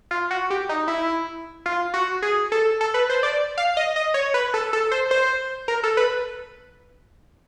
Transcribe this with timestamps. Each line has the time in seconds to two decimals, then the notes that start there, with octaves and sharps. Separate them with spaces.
0.11 F4
0.31 F#4
0.50 G4
0.69 D#4
0.88 E4
1.66 F4
1.94 F#4
2.22 G#4
2.52 A4
2.81 A4
2.94 B4
3.10 C5
3.23 D5
3.58 F5
3.77 D#5
3.96 D#5
4.14 C#5
4.34 B4
4.54 A4
4.73 A4
4.91 C5
5.11 C5
5.68 A#4
5.83 A4
5.97 B4